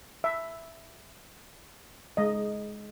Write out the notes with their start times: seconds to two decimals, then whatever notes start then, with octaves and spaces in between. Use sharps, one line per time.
0.24 E5
2.17 G#3 D#5